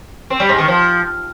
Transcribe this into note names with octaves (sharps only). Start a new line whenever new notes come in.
C4
G3
G#2
D#3
F3